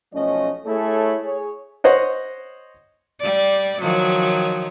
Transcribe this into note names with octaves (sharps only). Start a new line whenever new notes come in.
B1 F3 A3 C#4 D#5
A3 E4 G#4 A4 C#5
G#4 C#5
C5 C#5 D#5 F#5
G3 D5
D#3 F3 F#3